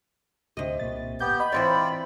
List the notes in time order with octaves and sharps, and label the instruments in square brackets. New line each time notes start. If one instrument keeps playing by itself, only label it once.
[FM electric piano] D2 [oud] C3 D#5
[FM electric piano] C2 A#2 A6
[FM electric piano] G#1 [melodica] B3 G4 [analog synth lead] G6
[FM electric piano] D#5 [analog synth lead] B5
[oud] E3 C4 C#5 [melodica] F4 D5